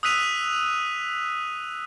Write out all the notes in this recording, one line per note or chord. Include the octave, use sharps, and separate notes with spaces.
D#6 E6 F#6 B6 D#7 F7